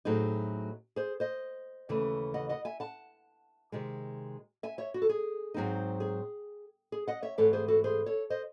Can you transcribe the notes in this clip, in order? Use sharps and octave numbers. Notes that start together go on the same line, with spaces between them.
A2 F#3 A3 C4 D#4 G#4
G#4 C5
C5 D#5
D#2 C#3 E3 A3
D#5 F#5
D#5 F#5
E5 G#5
F#5 A5
C3 D#3 G#3
E5 G#5
C#5 E5
F#4
A4
G#4
G#2 F#3 C4 D#4
G#4
G#4
D#5 F#5
C#5 E5
G#2 E3 A3 C4 A4 C#5
G#4 C5
F#4 A4
G#4 C5
A4 C#5
C5 D#5